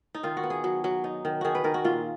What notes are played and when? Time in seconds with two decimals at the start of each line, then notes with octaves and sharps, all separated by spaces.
0.15 D#4
0.23 D#3 F4
0.37 F#4
0.43 B3
0.50 G#4
0.64 F#3
0.84 F#3
1.04 D#4
1.25 D#3
1.41 D#3 F#4 G#4
1.55 B4
1.64 D#3 A#4
1.74 F#4
1.84 A#2 F4